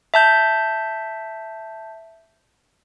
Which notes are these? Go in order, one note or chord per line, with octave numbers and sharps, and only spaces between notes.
E5 A5 G6